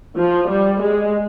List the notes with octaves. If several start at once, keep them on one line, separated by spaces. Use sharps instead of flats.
F3
G3
G#3